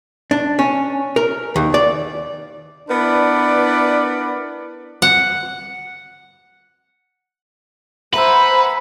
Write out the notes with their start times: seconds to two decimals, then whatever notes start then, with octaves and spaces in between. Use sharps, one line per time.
0.31 D4
0.59 C#4
1.16 A#4
1.56 D#2
1.74 D5
2.89 B3 D4 E4 A#4 B4 D5
5.02 F#5
8.14 B4 C5 E5 F#5 G#5 A#5 B5 E6